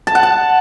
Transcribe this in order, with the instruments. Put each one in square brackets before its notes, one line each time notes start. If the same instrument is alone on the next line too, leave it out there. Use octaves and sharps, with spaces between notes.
[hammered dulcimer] A5
F#5
A5